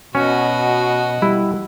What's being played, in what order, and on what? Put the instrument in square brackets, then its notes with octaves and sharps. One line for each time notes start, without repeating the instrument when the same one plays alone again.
[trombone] B2 [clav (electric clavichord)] C#4 [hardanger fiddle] F#4 D#5
[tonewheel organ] G3 [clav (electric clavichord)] E4